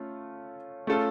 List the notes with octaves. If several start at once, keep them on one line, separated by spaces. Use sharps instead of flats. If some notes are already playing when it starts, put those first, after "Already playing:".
Already playing: A3 C#4 F4
A3 C#4 F4 A4